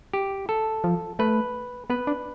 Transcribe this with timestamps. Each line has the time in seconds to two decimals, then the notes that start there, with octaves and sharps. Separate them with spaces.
0.13 G4
0.49 A4
0.84 F3
1.19 A3 B4
1.90 B3 B4
2.07 D4